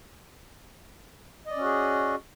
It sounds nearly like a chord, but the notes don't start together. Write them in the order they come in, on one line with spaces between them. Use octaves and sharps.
D#5 D5 C#4 F#4 G#4